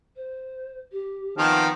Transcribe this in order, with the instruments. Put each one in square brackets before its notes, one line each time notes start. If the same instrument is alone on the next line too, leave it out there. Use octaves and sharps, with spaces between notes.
[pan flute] C5
G4
[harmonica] D#3 B3 C4 [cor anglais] F3 [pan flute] A#5